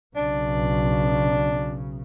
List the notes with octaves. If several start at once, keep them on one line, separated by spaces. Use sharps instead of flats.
B1 C#3 D4